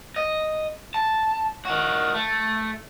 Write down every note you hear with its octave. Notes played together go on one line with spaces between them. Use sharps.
D#5
A5
D#3 F#4
A3